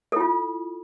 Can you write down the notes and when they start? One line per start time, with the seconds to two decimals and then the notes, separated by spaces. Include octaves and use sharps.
0.12 A4
0.16 E4
0.21 F4